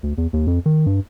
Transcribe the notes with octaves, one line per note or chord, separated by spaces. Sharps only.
D2
E2
D#2
F2
D#3
G2